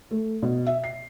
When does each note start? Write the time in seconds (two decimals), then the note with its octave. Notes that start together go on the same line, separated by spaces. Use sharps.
0.11 A3
0.42 B2
0.67 E5
0.84 C7